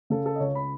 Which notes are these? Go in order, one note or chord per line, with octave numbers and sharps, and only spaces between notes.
C#3 A4
A4
D#5
C#2 C#5
B5